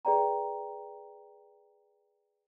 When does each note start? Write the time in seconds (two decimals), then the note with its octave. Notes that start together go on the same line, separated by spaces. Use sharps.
0.05 G#4 B4 D5 G5 A#5